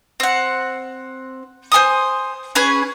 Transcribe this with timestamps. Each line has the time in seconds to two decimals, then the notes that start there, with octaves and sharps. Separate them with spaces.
0.20 C4 F#5
1.72 C5 G#5 C6 D#6
2.55 C#4 G#4 B4 G#5